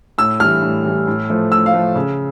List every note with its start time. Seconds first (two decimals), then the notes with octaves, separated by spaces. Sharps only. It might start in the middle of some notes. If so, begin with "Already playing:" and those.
0.18 A2 E6
0.40 E3 G3 F6
0.63 A2
0.85 E3 G3
1.07 A2
1.30 F3 A3
1.51 A2 E6
1.66 F5
1.73 F3 A3
1.96 C#3